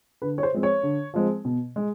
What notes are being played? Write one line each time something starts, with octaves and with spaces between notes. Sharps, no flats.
D3 B4
C#5
C5
F3 G#3 C4
C#5
D3
F3 G#3 C4
B2
G#3